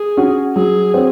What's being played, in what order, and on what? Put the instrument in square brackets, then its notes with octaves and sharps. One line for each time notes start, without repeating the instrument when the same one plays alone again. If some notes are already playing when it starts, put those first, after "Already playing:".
Already playing: [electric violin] G#4
[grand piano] C#4 F#4
[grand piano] F#3 [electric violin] G#4
[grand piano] C4 F#4 C#5